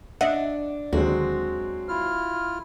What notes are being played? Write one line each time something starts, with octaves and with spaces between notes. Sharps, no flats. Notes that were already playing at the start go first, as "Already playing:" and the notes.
D4 D#5 E5 F#5
D#2 D3 F#3 G#3 C4 F#4
E4 F4 F6